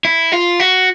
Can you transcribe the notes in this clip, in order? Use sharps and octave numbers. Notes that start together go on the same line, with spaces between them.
E4
F4
F#4